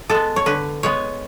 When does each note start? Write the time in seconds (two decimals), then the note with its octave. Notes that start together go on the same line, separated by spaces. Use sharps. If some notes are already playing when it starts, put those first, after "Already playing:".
0.10 G#3 B3 A4
0.36 C#5
0.46 D3 B4
0.83 G#3 B3 C#5